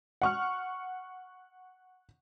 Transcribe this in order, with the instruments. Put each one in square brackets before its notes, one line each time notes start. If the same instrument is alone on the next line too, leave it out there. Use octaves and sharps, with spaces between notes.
[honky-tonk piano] F#5 C#6 F6